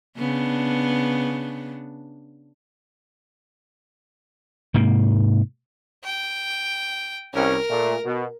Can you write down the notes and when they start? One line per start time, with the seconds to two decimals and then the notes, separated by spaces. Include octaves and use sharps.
0.18 C#3 B3 D4
4.74 G#2 C3 A#3
6.04 G5
7.34 C2 C#4 A#4
7.69 A#2 A3
8.04 B2